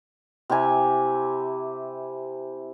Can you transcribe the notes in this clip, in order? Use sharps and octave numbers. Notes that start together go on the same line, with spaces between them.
C3 E4 G4 G#5